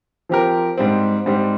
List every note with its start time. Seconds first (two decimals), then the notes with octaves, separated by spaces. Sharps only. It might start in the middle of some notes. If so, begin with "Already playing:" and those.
0.29 F3 C4 G4 A#4
0.78 G#2 G3 C4
1.26 G#2 G3 C4